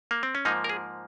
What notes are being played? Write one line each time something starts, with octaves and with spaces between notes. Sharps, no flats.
A#3
C4
C#4
G#2 F3 A#3 D#4
A#4
G#4